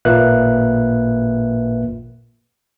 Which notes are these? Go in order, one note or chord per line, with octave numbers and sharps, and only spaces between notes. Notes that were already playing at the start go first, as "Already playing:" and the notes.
A1 A#2 A#3 B4 E5 F#6